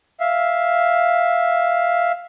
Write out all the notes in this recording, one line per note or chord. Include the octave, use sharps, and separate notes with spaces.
E5 F5